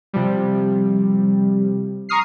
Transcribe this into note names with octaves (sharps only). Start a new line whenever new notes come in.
C3 F3 G3
A#5 C#6 D#6 F6 C7